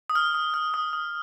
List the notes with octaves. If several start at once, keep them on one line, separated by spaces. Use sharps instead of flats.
D#6
F6
D#6
F6
D#6
D#6